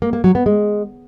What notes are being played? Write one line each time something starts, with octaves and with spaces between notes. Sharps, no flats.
A#3
A#3
F#3
B3
G#3